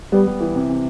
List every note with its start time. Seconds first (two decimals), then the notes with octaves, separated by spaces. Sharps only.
0.12 G3 B3
0.27 G3
0.40 E3
0.55 C3
0.70 C3